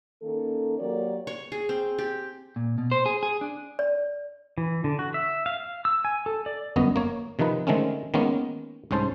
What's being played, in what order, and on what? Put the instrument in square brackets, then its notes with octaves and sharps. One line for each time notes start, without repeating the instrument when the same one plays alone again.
[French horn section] D#3 A#3 C#4 A4
F#3 A#3 G4 A#4 C#5 D5
[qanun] C#5
G#4
C4
G4
[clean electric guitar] A#2
B2
C5
G#4
G#4
D4
[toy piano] D5
[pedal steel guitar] E3
D3
F#4
E5
F5
F5
E6
G#5
A4
D5
[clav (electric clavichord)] G1 F#2 B3 D#5
A#3 C#5
C3 D#3 F3 D#4 B4
D3 D#3 G#3 A3 C4 C#4
D#3 G#3 A#3 B3 C#4
C2 G#2 C#4 C5 A5